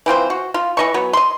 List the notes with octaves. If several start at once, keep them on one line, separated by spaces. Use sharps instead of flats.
E3 C4 F4 C5
F#4
F4
E3 D#5 C#6
F#3 B3
D#5 C6